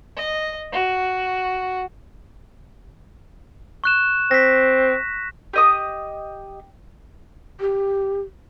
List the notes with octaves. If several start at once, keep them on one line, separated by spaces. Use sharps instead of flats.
D#5
F#4
C#6 F#6 E7
C4 A#6 B6
G4 D#5 D#6
G4